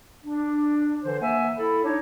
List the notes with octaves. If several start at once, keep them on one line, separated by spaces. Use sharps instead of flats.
D4
D3 E3 C5
A#3 E5 F#5 G#5
E4 A4 B5
D4 D#4 C#5